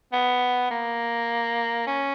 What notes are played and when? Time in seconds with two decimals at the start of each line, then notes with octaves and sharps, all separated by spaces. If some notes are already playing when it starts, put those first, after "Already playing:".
0.13 B3
0.71 A#3
1.87 C#4